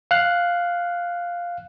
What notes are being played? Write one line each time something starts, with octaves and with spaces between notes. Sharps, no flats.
F5 F#6